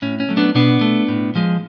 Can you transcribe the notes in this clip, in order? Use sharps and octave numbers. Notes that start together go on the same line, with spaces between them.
A2 C#4
C#4
F#3 A3
B3 D4
B2 B3 D4
A3
A2
F3 G#3